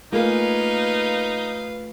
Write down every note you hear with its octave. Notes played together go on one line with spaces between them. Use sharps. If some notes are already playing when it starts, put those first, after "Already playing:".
A3 A#3 D#4 F4 G#4 B4 F5